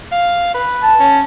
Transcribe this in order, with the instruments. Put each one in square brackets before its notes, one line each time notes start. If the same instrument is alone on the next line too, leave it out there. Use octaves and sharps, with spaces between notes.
[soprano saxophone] F5
B4
[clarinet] A5
[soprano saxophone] C#4